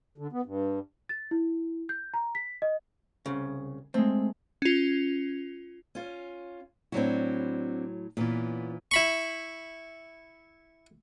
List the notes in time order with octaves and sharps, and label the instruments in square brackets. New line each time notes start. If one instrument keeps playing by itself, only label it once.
[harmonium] D3
B3
G2
[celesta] A6
E4
G6
A#5
B6
D#5
[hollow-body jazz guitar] C2 C#3
[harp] G#3 A3 [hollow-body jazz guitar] C4
[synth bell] C#4 F4
[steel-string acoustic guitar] C#4 F4
[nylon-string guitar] A2 F#3 E4 [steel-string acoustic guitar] C4 D4 F#4
[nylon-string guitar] A#2 E3 [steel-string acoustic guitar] B3 C#4
[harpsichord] E4 B5 C#6